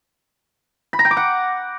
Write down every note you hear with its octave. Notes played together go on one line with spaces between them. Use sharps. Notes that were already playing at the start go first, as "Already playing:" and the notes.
B5
A#5
G5
D6
F#5